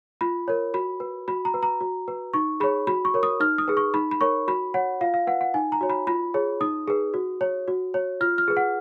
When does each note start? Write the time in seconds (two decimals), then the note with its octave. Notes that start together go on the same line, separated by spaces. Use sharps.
0.21 F4 B5
0.48 A#4 C#5
0.74 F#4 B5
1.00 B4
1.28 F#4 B5
1.45 A#5
1.54 B4
1.63 A#5
1.81 F#4
2.08 B4
2.33 D#4 C#6
2.60 G#4 C#5 B5
2.87 F#4 B5
3.05 C#6
3.14 A#4 C#5
3.23 D#6
3.40 D#4 F6
3.58 D#6
3.68 G#4 B4
3.77 C#6
3.94 D#4 B5
4.11 B5
4.21 A#4 C#5 C#6
4.48 F#4 B5
4.74 C#5 F#5
5.01 F4 F5
5.14 F5
5.27 B4 F#5
5.41 F#5
5.54 D#4 G#5
5.72 A#5
5.81 F#4 C#5
5.89 B5
6.07 F4 B5
6.34 G#4 C#5
6.61 D#4 D#6
6.88 G#4 B4
7.14 F#4
7.41 C#5
7.68 F#4
7.94 C#5
8.21 F4 F6
8.38 F6
8.48 G#4 B4
8.57 F#5